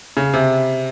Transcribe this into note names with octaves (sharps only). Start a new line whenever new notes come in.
C#3
C3